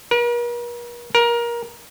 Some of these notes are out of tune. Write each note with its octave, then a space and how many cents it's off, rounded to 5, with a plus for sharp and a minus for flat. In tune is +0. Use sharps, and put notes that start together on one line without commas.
A#4 +45
A#4 +20